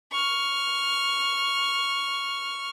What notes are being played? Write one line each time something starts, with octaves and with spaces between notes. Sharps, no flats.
C#6 F6